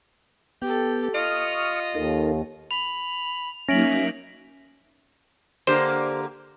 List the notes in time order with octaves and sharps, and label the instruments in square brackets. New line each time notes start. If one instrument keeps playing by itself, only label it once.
[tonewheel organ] B3 G5 [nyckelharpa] G4 A4
[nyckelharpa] F4 [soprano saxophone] D#5 [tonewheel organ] C#6 D#6 F6
[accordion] D#2 [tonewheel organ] D#4 A4 A#4
[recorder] B5 [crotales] F7
[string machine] F#3 A#3 D#4 [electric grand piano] C#4 [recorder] E5 [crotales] A#6 D7 F#7
[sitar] D3 A#3 G4 [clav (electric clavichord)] C5